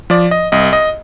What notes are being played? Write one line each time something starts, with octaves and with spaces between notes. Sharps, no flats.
F3 D5
D#5
C2 D#5
D#5